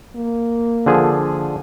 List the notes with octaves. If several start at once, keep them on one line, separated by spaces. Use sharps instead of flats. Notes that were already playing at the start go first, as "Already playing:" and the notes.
A#3
D3 F3 G#4